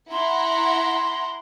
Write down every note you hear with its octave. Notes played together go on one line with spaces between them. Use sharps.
E4 F#5 A#5 C6